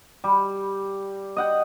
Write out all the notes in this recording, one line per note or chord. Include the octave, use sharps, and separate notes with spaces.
G3
D#5 F#5 G5